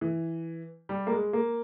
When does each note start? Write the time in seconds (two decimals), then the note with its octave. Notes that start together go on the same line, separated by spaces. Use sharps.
0.01 E3
0.89 G3
1.07 A#3
1.12 G#3
1.33 A#3